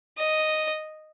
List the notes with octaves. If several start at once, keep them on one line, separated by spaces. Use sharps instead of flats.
D#5